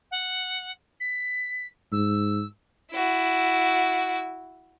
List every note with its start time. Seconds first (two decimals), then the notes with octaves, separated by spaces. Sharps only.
0.11 F#5
1.00 B6
1.92 G#2 E6
2.93 E4 F#4